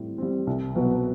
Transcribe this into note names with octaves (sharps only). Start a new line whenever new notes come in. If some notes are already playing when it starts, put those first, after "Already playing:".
Already playing: A2 G3 C4
G3 C4
C2
B2 F#3 B3 F#4